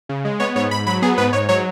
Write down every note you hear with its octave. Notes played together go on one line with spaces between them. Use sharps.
C#3
G#3
B3 C#5
G#2 C#5
G#2 B5
F#3 B5
B3 G#4
G#2 B4
G#2 C#5
F#3 C#5